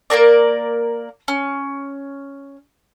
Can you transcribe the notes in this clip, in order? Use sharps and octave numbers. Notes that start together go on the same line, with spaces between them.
A#3 D#4 A#4 D5
C#4